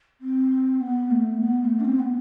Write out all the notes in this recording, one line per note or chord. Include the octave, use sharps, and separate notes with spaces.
C4
B3
A3
B3
B3
A3
D4
C4
B3